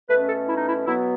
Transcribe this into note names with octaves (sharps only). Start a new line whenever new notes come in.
B2 A3 C#4 B4
A4
E4
D#4
E4
B2 F#3 B3 E4